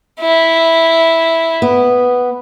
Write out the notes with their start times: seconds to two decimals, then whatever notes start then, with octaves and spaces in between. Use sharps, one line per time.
0.21 E4
1.62 B3